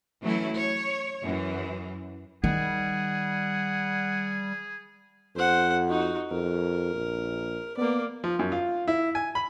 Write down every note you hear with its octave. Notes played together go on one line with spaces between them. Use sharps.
E3 F#3 A3 C#4 E4
C#5
F#2 E3
D#3 G3 G#4 F#5
F2 C5 F#5
D#4 F#4
F2 A#4
A#1
A#3 B3 D5
F3
F#2
F4
E4
G#5
B5